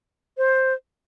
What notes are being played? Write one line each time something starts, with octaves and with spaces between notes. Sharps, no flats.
C5